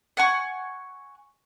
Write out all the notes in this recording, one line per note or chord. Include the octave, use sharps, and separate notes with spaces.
F#5 G#5 C#6